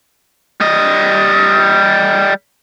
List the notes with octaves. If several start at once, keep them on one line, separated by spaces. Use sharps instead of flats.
G3 D#5